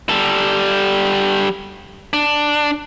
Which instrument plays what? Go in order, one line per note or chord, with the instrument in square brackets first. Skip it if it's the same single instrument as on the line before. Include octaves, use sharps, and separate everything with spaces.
[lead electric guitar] G3 A4
D4